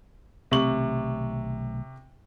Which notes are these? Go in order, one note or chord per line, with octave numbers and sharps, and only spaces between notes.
B1 C3 D#3 A3 C#6 F#7